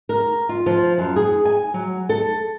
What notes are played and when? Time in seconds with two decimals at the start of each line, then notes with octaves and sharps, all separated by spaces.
0.09 A#4
0.49 F4
0.66 F3
0.98 F#2
1.16 G#4
1.45 G#5
1.74 F#3
2.09 A4